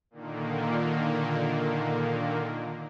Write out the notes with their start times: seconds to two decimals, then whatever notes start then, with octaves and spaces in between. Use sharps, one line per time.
0.11 A#2 D3 D#3 A#3